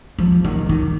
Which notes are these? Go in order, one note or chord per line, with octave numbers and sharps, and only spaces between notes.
F3
D#3
D#3